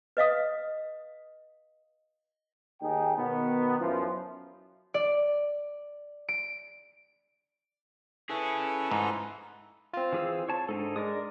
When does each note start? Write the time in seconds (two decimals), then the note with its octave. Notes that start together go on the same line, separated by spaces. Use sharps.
0.17 B4 D#5 F5 D#6
2.81 D#2 D#4 G#4 G5
3.16 B2 D#3 B3
3.79 F#2 E3 F3
4.94 D5
6.29 D7
8.30 C#4 E4 G#4 A4 B4
8.91 G#2 D#4 F4
9.93 C4 F4
10.13 E3 G#4 E6
10.49 C#5 A5
10.69 G#2 D4 D#4 A4
10.96 G#3 A#4 D5 D#6